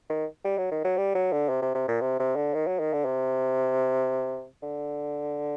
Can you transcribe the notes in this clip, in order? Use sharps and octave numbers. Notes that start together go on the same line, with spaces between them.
D#3
G3
F#3
D#3
F#3
G3
F#3
D3
C3
C3
C3
A#2
C3
C3
D3
D#3
F#3
D#3
D3
C3
D3